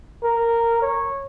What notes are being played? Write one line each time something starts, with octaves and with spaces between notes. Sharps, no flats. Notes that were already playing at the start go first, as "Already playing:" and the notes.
A#4
C#5